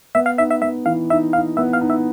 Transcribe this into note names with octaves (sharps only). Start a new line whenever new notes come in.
B3 E5
F5
D#4 E5
E5
B3 E5
E3 F5
D#4 E5
D#4 F5
B3 E5
F5
D#4
E5